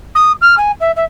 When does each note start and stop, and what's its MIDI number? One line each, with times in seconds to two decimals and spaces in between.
0.15 0.32 87
0.41 0.55 89
0.57 0.71 80
0.80 0.91 76
0.96 1.04 76